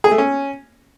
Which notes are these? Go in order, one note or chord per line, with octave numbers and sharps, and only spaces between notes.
G#4
A3
C#4